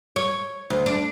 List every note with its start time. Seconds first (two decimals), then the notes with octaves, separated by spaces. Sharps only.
0.16 C#5
0.70 D2
0.86 D4